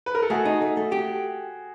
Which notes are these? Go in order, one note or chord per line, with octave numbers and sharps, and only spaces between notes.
B4
A#4
A4
A3 F#4 G#4
D#4
A3
A3
G4